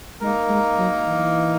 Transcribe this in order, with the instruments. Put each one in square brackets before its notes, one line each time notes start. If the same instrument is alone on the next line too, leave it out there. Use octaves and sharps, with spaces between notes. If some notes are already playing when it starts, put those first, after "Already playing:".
[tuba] G#3 [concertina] A#3 D#4 A#4
[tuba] G#3
F#3
E3